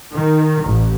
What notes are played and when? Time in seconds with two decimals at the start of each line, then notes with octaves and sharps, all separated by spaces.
0.13 D#3
0.65 A1